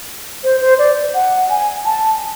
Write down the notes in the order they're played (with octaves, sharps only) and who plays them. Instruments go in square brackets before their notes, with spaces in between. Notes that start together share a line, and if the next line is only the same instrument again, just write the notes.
[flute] C5
C5
D5
F#5
G#5
A5